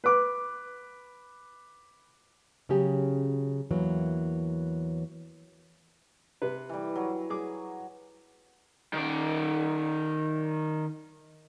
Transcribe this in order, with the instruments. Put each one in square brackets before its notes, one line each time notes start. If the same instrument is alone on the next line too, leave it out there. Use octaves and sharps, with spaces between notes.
[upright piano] B4 D6
[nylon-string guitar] C#3 F#3 C#4 G4 G#4
E2 E3 F#3 A#3
[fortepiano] C3 B4
[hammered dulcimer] E3 G3
F#3
[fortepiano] G#4 D6
[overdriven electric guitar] D#3 D5